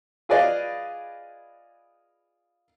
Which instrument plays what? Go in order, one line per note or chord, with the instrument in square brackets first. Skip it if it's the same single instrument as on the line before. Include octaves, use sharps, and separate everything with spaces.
[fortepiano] F4 G#4 B4 D5 D#5 F5